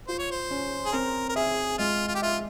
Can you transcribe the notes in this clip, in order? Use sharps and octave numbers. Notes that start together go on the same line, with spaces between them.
F4 C5
C#5
C5
C#4
G#4
C4 A#4
A#4
G#4 E5
G#3 F4
F4
G4
F4 E5